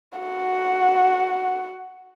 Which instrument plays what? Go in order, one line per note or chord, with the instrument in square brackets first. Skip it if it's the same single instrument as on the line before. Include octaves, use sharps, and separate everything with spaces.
[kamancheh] F#4 F#5